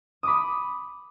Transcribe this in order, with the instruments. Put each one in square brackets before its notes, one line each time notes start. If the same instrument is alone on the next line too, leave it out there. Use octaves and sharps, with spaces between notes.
[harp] B5 D6 D#6